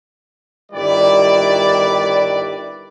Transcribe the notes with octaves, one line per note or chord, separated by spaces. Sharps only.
G1 D#3 G3 E4 B4 D5